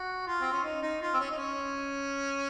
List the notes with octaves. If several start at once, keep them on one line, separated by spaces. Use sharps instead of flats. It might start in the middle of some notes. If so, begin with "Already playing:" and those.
Already playing: F#4
F4
C4
C#4
D#4
D#4
F4
C4
C#4
D#4
C#4